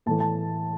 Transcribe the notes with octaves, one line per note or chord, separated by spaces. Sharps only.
A2 E3 A3 A5
A5